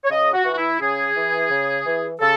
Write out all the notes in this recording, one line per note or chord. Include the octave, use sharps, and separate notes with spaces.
C#5
C#3 D#5
F#4
E3
F#4
E4
C#3 G#4
E3
C#3
E3
C#3 A4